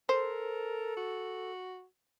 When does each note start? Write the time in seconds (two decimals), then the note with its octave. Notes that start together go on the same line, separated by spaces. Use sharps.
0.09 A4 A#4 C5
0.97 F#4